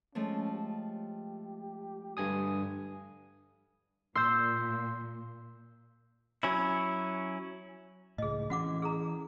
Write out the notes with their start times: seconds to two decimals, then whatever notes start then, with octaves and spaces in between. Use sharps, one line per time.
0.15 F3 G#3 A3 C#4
0.53 G4
2.17 G2 D3 G#5 D#6
4.16 A#2 C6 E6 G6
6.43 F#3 C#4 E4
8.18 C#2 A2 G#4 D#5
8.50 E3 C#4 F#4 F#5 D6
8.82 G#4 A4 A#5